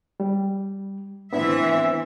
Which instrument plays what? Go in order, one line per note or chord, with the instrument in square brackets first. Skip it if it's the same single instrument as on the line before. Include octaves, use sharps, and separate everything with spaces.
[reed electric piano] G3
[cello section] E3 C4 E5 [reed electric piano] B3 D4 E4